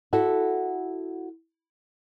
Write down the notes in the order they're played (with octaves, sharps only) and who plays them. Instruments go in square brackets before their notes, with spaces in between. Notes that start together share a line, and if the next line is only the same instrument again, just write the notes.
[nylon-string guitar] E4 F#4 A4